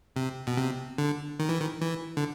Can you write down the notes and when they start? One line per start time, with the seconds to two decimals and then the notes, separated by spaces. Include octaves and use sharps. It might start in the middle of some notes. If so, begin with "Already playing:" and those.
0.16 C3
0.47 B2
0.57 C3
0.98 D3
1.39 D#3
1.49 E3
1.60 D#3
1.81 E3
2.17 D3